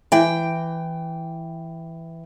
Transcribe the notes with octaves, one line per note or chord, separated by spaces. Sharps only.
E3 G5